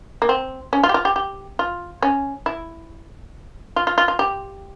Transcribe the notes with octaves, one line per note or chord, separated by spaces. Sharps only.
A#3
C4
C#4
F4
G4
F4
G4
G4
F4
C#4
E4
F4
F4
F4
F4
G4